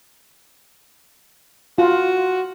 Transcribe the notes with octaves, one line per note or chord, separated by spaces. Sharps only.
F4 F#4